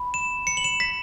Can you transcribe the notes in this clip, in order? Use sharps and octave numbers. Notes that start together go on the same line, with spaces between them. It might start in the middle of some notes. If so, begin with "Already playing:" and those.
Already playing: B5
E7
C#7
F#7
E7
B6